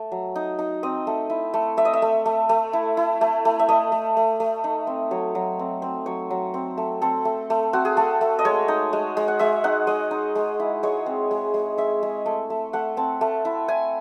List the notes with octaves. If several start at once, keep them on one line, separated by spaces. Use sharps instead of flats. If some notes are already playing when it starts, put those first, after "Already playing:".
Already playing: A3
F#3
D#4
D#4
C4 D#5
A3
E4
A3
A3 E5
D#5
E5
A3
A3
A3
E4
E4
A3
A3
E5
A3 D#5
A3
A3
A3
D#4
C4
F#3 C#5
F#3
C4
C4
F#3 C#5
F#3
C4
A3
C4 A4
A3
A3
C4 F#4
G#4
A3 A4
A3
D#5
G#3 C#5
D#4
G#3
G#3
F#5
G#3 E5
D#4 F#5
G#3 D#5
D#4
G#3
E4
G#3 C#5
C4
G#3
G#3
G#3 E5
G#3
A3
A3
A3 F#5
C4 A5
A3
E4
E4 G#5